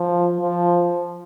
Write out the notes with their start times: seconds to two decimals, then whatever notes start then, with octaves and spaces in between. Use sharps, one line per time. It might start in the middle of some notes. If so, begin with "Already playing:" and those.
Already playing: F3
0.40 F3